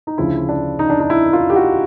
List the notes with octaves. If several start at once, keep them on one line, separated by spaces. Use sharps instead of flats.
D#4
D2 C#3 F3 E4
D4
D#4
D4
D#4
E4
F4
G4
F#4